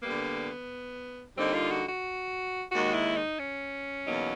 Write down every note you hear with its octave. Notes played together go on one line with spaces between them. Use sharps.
D3 G3 A#3 B3
D3 G3 A#3 C4 D#4
F4
F#4
F#4
D#2 D#3 G#3 F#4
E4
D#4
C#4
E2 B2 F#3 A#3 D#4